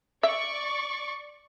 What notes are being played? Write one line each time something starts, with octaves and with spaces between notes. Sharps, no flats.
D5 E5 C#6